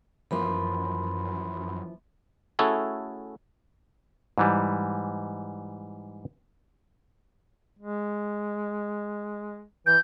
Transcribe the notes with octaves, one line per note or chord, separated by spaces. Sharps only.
F#2 E3 F3 A#3 B5 C6
A3 C#4 E4 F#4 G#4 A4
G#2 E3 G3
G#3
E3 G6